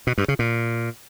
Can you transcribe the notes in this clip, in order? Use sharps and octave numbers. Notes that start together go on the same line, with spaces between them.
B2
G2
C#3
A#2